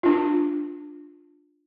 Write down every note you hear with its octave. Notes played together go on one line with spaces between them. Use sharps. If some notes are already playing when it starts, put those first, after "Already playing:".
D4 F4